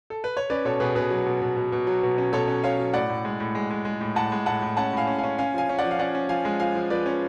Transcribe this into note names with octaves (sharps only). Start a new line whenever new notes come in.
A4
B4
C#5
C#4 B4 D5
B2 A4 C#5
B2 G#4 B4
B2 G#4 B4
F#3
B2
B2
B2
B2
F#3
B2
C#4
B2 A4 C#5
C#4
C#4 C#5 F5
F#3
A2 D5 F#5
A2
G#3
A2
G#3
G#3
G#3
A2
A2 F#5 A5
G#3
A2 F#5 A5
A2
C#4 F#5 A5
A2 F5 G#5
C#4
F5 G#5
C#4
C#4 F5 G#5
F3 F5 G#5
C#4
D5 F#5
F3
F5
C#4 D5 F#5
C#4
F3 F5 G#5
G#3
F3 F5 G#5
F3
F3 B4 D5
C#4